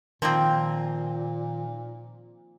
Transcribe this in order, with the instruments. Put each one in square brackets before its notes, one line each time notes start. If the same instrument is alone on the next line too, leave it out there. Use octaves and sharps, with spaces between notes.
[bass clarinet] A#2 [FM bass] D#3 [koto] F3 A#3 C4